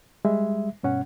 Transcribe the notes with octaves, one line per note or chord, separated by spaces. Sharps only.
G3 G#3 E5
G2 B2 C#4 F#5